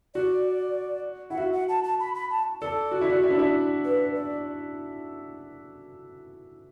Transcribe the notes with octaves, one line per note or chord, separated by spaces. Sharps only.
F#4 D5
E4 F#5
F#4 E5
F#5
A5
A5
B5
B5
A5
A4 D5
F#4
E4
F#4
E4
D4
E4
B4
D5